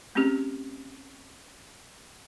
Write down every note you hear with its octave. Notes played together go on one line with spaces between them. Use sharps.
A3 C4 C#4 G4 G#4